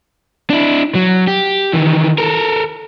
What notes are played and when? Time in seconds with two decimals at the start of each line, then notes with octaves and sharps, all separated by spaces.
0.50 D4 E4
0.95 F#3
1.27 G4
1.73 D#3 E3
2.18 A4 A#4